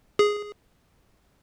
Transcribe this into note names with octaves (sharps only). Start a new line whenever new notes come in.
G#4